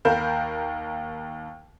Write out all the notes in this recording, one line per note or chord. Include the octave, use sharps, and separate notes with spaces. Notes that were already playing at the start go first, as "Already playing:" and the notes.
D#2 A#4 F5 B5 G6 E7